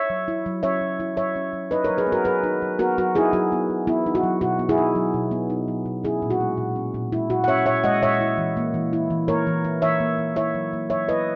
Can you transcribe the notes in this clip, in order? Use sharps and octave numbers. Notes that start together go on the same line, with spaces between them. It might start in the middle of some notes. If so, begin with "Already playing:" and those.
Already playing: C#5 E5
F#3
E4
F#3
C#4 C#5 E5
F#3
E4
F#3 C#5 E5
C#4
F#3
D#4 B4 D#5
A#4 C#5
F#3
G#4 B4
B3
F#4 A#4
F#3 G#4 B4
D#4
F#3
B3 F#4 A#4
F#3 F#4
D#4 E4 G#4
F#3 F#4
B3
F#3
B3 E4
D#4
F#4
F#3
B2 F#4
B3
E4 G#4
D#4
F#3
B2
B3
D#4
F#3
B2
C#4 E4 G#4
A#2
F#4
G#3
A#2
C#4
A#2
G#3 E4
A#2 F#4
F#5
C#4 C#5 E5
A#2 C#5 E5
G#3 D#5 F#5
A#2 C#5 E5
E4
E3
A#3
E3
E4
E3
A#3 A#4 C#5
E3
E4
E3 C#5 E5
A#3
E3
E4 C#5 E5
F#3
A#3
F#3 C#5 E5
E4 B4 D#5